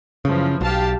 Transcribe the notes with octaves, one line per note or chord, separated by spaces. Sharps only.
F#2 C#3 E3 F3
B1 G4 F5 A5